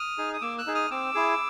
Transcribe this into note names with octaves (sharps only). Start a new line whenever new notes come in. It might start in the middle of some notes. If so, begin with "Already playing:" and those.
Already playing: D#6 F6
D#4 G#4
D#6
A#3 D6 E6
E6 F#6
D#4 G#4
D#6 F6
C4 D6 E6
E4 G#4